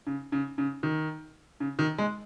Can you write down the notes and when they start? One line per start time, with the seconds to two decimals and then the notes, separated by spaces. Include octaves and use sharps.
0.07 C#3
0.32 C#3
0.58 C#3
0.83 D#3
1.60 C#3
1.79 D#3
1.98 G#3